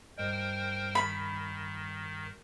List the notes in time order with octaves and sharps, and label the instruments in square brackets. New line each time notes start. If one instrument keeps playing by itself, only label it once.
[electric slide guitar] G2 D#5 [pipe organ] A#4 C5 G5
[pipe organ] D#3 [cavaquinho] B5